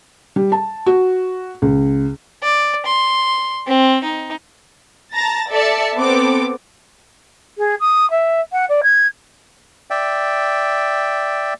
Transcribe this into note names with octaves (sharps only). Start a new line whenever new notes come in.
G3
A5
F#4
C#2
D5
C6
C4
D#4
A5 A#5 A6 A#6
A4 D5 E5 A5 C#7
B3 C4 A4 D6
G#4
D#6
E5
F#5
D5
G#6
D5 E5 G5